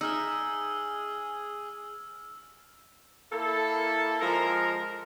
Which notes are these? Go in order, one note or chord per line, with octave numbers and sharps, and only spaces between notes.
D#4 G#4 E5 E6 F6
A#3 E4 A4
F3 G#3 A#4